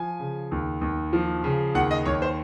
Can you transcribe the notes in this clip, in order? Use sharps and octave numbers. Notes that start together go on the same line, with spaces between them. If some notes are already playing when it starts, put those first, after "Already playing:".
Already playing: F3 G#5
C#3
D#2
D#2
F3
C#3
D#2 F#5
D#5
D#2 C#5
C5